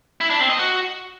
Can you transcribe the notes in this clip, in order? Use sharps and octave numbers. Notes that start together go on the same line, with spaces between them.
E4
D4
C4
D#5
F#4